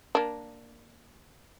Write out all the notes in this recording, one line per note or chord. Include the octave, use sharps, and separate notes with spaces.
A#3 D4